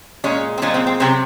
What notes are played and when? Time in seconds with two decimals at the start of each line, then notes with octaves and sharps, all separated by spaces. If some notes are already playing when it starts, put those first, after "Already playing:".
0.24 A#2 G#3 C#4
0.58 C4
0.62 A#2 F3 G#3 C#4
0.74 C4
0.87 C4
1.00 C3 F#3 C4